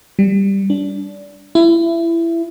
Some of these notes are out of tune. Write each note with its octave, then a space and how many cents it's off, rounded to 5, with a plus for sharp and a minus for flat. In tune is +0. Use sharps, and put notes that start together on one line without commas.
G3 +5
D4 -25
E4 +20